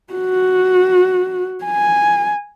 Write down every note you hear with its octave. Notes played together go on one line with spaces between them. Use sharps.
F#4
G#5